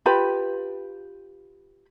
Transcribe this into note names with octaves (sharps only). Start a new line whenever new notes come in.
F4 G4 B4 B5